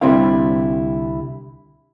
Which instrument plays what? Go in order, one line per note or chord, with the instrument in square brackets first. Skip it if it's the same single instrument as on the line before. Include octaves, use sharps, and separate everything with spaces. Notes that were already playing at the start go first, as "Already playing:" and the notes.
[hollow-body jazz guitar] C2 D3 G3 C4 E4 F5